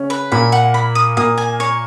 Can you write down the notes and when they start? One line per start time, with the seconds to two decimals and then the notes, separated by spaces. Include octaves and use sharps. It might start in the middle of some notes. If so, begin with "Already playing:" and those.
Already playing: C#3 C#4
0.10 B4
0.32 A#2 A#3 B5
0.52 F#5
0.74 B5
0.95 D#6
1.17 A#2 A#3 D#6
1.37 G#5
1.60 C#5